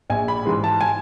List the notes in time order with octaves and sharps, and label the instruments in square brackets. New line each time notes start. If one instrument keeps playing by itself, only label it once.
[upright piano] A#1 G#5
B5
G#2 E3 G#3
A5
G#5